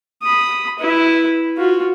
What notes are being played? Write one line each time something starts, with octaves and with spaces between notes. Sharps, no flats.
B5 D#6
E4 B4
F4 F#4